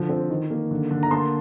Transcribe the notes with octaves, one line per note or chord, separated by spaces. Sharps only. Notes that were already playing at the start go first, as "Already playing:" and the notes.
Already playing: D3 F3
C4
D#3
A#3
D3
D3
A#5
A#3 A5 C6